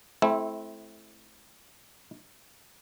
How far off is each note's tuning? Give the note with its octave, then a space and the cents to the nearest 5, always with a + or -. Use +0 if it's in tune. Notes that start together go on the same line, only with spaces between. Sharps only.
A3 -30 C4 +0 E4 -5